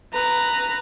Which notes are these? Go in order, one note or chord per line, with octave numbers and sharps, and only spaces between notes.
B4 A#5